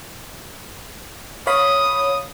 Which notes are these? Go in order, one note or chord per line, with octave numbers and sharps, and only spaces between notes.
C#5 F5 B5 D#6